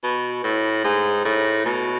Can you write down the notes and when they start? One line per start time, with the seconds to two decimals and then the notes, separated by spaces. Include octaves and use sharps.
0.03 B2
0.44 A2
0.84 G#2
1.25 A2
1.65 B2